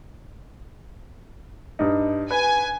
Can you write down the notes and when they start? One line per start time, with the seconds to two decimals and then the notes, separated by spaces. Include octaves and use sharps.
1.79 G2 D#4
2.31 B4 G#5